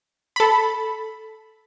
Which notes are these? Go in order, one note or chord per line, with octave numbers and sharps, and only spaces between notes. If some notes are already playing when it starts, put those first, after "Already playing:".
A4 B5